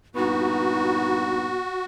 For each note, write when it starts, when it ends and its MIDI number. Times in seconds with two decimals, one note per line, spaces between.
0.15 1.63 43
0.15 1.63 46
0.15 1.63 59
0.15 1.48 63
0.15 1.85 66